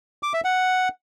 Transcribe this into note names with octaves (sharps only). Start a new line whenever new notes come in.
D6
E5
F#5